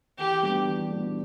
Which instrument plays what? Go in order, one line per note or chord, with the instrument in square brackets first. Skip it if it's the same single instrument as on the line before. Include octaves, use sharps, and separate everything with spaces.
[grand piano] E3 [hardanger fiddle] G4
[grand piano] G3 B3 D4 F#4
E3
G3 B3 D4 F#4